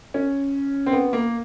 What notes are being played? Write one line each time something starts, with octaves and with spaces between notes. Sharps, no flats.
C#4
C4
B3
A#3